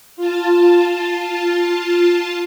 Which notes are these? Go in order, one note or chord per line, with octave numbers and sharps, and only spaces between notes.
F4 A5